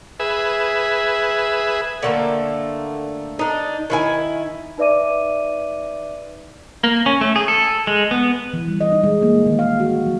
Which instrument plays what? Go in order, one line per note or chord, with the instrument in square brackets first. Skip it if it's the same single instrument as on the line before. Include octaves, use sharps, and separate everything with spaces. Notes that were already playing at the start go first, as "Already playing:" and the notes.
[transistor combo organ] G#4 B4 E5
[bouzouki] D3 A3 A#3
D4 D#4
D#3 E4 G#5
[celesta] D#4 B4 D5 E5 D6 D#7
[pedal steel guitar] A#3
C#4
A3
G#4
A4
G#3
B3
[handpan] E3
G3
D#5
D#4
G#3
A#3
D#3
F5
F#4
F#3